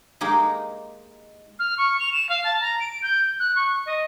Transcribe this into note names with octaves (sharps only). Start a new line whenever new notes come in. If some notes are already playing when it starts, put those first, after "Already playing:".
G#3 A#3 D#4 G4 G#4
F6
C#6
F7
E7
F5
A5
A#5
D7
G6
F#6
C#6
D#5